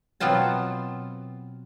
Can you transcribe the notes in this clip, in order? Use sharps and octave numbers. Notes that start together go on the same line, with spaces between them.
B2 F#3 B3 C4 F4 A5